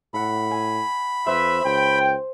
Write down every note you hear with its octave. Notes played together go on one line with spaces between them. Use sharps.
A2 A4 F#5 B5
G#5
F2 B4 C5 E5
C#2 G5